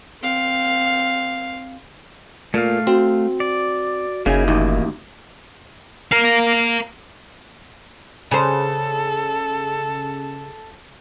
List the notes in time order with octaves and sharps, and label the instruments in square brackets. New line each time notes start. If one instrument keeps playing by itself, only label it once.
[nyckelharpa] C4 F5
[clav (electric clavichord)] A#2 [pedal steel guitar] A3 F5
[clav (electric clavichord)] C4 [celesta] F#4
[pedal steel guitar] D5
[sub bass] F#1 [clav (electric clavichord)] C#3 G#5 [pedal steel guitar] A#3 D#4 E4
[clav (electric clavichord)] A1 D#2
[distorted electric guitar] A#4 F5
[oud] C#3 C5 [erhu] A4